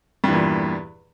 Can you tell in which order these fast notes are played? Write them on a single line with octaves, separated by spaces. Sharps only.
G2 E2 A#2